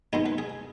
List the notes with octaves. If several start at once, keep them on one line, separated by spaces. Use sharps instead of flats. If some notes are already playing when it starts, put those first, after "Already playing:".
B2 G#3 B3 D#4 G#4
B4
G#4